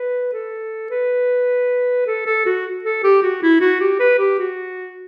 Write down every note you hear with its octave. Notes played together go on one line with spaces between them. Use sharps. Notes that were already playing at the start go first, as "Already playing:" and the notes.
Already playing: B4
A4
B4
A4
A4
F#4
A4
G4
F#4
E4
F#4
G4
B4
G4
F#4